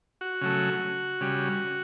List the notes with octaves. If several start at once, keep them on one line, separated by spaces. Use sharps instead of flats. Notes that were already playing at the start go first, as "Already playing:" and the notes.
F#4
C#3 F#3 A3
C#3 G3